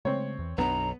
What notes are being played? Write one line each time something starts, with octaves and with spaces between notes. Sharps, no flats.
C#3 G#3 A3 C4 C#5
E2 E3
B1 F#2 B3 D4 A#5